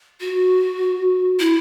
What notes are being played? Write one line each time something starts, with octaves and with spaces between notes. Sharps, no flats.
F#4
E4